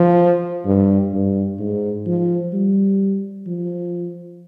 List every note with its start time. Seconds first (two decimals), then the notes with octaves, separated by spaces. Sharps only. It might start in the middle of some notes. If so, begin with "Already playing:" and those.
Already playing: F3
0.66 G2
1.13 G2
1.59 G#2
2.07 F3
2.53 G3
3.47 F3